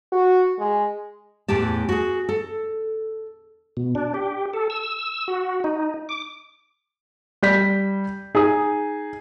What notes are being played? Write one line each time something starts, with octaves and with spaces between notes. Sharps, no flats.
F#4
G#3
E2 A2 E3 G4 A5
F#4 G#4
A4
B2
D4
G4
A4
E6
F#4
D#4
D6
G3 G6 B6
D#4 G#4 G#5 D#6